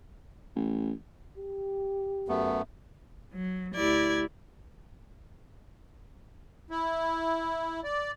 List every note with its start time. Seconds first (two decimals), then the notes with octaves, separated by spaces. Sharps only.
0.56 A1
1.38 G4
2.28 F#2 A3 B3
3.32 F#3
3.75 D2 E4 G4 D5 G#6
6.71 E4
7.84 D5